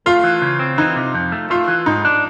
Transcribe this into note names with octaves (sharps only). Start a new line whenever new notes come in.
A3 F4
E3
C#3
C4
E3 D#4
C3
F2
A3
A3 F4
E3
G#2 D#4
D4